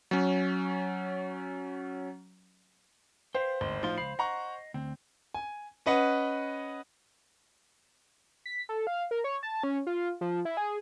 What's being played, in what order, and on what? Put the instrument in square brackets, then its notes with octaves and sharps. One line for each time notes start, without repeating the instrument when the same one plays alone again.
[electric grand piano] F#3 C#4
[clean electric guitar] B4 F5 G5 [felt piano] C5
[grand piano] G#1 [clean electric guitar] D2 C6
[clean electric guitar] A2 D#4 C6 [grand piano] F3 F4
[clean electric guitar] C#2 F5 B5 [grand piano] C7
[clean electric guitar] D#5 [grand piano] F#5 A#5 C#6
[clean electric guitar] D2 [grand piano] C4
[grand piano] G#5
C#4 B4 D#5 F#5
[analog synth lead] B6
A4
F5
A#4
C#5
A5
C#4
F4
F3
E4
G#4